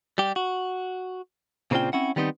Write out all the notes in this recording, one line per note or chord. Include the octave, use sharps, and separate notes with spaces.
G3 G4
F#4
A#2 C#3 C4 D4 F4 G5
C4 C#4 E4 F#5
D#3 G3 B3 C4 D#4